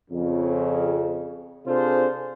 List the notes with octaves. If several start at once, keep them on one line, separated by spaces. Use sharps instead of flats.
F2 C#3
C3 D4 F4 G#4 A4 C5